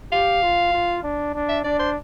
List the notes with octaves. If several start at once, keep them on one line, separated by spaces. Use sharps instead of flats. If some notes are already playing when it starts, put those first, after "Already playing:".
G4 F5
F4
F4
D4
D4
E5
D4 D5
C5